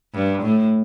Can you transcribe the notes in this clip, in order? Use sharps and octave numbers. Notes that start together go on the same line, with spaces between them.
G2
A2